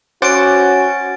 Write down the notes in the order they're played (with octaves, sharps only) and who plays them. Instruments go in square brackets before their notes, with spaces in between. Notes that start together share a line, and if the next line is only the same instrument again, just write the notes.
[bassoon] C#4 [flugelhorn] F#4 [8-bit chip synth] C5 F#5 D6 [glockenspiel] A6 D7